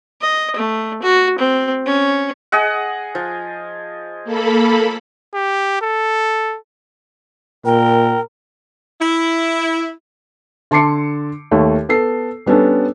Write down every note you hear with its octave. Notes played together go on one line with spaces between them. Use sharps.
D#5
A3
F#4
C4
C#4
G#4 D#5 F#5
F3
A#3 A4 B5
G4
A4
A#2 A#4 G5
E4
D3 A5 C6 D6 C7 C#7
D#2 A3 C#5
B3 A4 C7
G3 B3 C#4 D4 A4